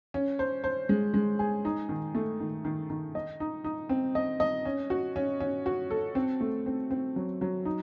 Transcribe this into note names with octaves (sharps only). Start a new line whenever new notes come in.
C#4
C5
C5
G#3
G#3
G#4
D#4
D#3
A3
D#3
D#3
D#3
D#5
D#4
D#4
C4
D#5
D#5
C#4
F#4
C#4
C#4
F#4
A4
C4
A3
C4
C4
F#3
F#3
D#4